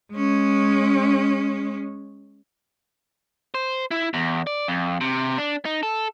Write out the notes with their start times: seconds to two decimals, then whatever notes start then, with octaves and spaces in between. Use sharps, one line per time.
0.13 G#3 C#4
3.54 C5
3.91 E4
4.14 E2
4.47 D5
4.68 F2
5.01 C3
5.38 D4
5.65 D#4
5.83 A4